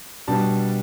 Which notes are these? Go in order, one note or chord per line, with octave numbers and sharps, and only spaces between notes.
B2 G3 D4 A5